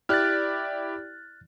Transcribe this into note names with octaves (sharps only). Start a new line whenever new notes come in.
E4 G4 D5 F6 F#6 A6